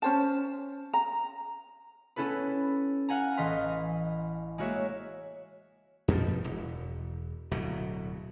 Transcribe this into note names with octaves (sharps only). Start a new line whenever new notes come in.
C#4 C5 A5
A#5
B3 C#4 E4 A4 B4
F5 F#5 G#5 A#5
A1 E3 D#5 F5 C6 B6
G#3 A#3 F#4 C#5 E5
F2 B2 F3 G3
E1
D1 B2 F#3